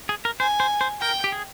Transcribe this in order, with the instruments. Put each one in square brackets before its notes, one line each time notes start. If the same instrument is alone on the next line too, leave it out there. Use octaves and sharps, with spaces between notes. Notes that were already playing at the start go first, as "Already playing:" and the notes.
[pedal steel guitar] G#4
A#4
[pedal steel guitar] C5 [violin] G#5
[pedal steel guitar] C5
C5
[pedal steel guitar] A#4 [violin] G5
[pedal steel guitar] G4
G#4